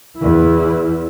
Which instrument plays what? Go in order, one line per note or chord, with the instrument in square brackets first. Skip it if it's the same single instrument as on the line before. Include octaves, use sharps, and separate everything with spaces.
[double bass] E2 E4